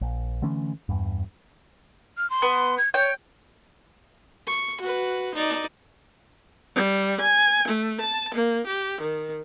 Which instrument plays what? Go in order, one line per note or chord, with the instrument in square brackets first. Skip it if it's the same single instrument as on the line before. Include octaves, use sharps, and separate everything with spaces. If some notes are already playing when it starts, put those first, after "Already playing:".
[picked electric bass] A#1
D3 E3 A3 C#4
E2 G2
[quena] F6
C6
[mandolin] B3
[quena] G#6
[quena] C#5 [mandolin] G5
[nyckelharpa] C#6
F#4 B4
D#4 D5
[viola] G3
G#5
A3
A5
A#3
G4
D#3